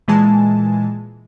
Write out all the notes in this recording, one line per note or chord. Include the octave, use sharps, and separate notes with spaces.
A#2 E3 G#3 G#5 A5